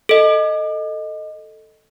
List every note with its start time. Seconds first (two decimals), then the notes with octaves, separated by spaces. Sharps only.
0.09 A4 D#5